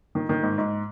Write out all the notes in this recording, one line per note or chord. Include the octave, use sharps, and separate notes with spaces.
D#3
D#3
G#2
G#2